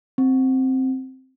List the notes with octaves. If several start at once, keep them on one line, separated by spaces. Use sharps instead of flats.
C4